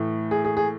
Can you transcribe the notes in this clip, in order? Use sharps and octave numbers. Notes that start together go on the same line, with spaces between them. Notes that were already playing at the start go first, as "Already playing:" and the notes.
Already playing: A2 E3 A3
G#4
G#4
G#4